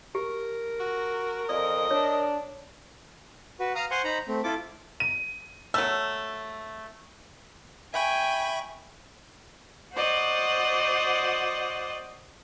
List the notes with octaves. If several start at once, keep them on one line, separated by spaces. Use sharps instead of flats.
G4 A#4
F#4
F2 D5 D#5
D4 C#5
F#4 B4
F5 A#5 D#6 F6
C5 F#5 G#5 C6 C#6
D#4 C5 A#5 B5
A3 C4
E4 F4 A4 D6
D#7
F#3 A3 E6
E5 G5 G#5 B5 C#6
F#4 C5 D5 D#5 F#5